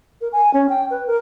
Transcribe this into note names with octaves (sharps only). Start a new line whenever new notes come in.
A#4
G#5
C#4
G5
B4
A#4